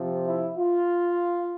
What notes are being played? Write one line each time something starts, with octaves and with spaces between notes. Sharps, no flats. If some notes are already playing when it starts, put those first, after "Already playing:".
Already playing: C3 F3
E4
F4